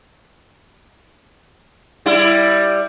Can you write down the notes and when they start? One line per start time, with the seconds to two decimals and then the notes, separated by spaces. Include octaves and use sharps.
2.06 G3 E4